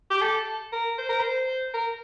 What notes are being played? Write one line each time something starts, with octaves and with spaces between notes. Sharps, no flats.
G4
A4
A#4
C5
A#4
C5
A#4